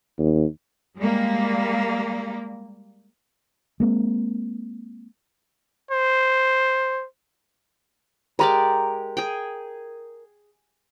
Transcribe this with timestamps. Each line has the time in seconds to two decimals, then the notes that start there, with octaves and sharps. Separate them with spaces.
0.19 D#2
0.97 G3 G#3 A#3
3.80 G#3 A#3 C4
5.91 C5
8.39 G#3 G4 A#4 D5
9.17 G#4 G5